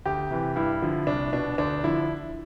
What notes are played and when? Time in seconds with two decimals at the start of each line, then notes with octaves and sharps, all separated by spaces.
0.06 D2 G4
0.31 C3 E3
0.56 G2 E4
0.82 D3 F3
1.07 C2 D4
1.32 B2 D4
1.58 D2 D4
1.84 D3 F3 E4